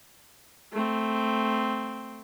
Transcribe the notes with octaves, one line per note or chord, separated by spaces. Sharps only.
A3 C4